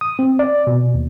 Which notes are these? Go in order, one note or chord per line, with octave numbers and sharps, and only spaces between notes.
D#6
C4
D5
B2
D#2